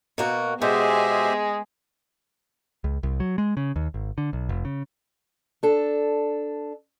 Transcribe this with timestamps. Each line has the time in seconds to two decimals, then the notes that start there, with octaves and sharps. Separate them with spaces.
0.18 B2 A#3 F#4
0.62 B2 G#3 G4 G#4 C5 E5
2.84 C#2
3.03 C2
3.20 F#3
3.38 G#3
3.57 C#3
3.76 D#2
3.94 G#1
4.18 D3
4.33 B1
4.49 F1
4.65 C#3
5.63 D4 A4